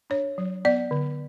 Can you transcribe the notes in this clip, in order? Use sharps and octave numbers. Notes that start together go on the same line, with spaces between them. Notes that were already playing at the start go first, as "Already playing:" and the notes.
D4 C#5
F#3
B3 D5
D3